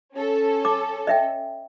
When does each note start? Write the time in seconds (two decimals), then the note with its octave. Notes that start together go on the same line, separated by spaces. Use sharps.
0.15 C#4 A4
0.65 D6
1.07 D#5 E5 G5